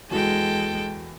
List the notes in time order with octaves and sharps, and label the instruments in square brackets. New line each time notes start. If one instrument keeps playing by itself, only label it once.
[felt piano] E2 F#4 [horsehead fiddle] G#3 [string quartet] A4 G5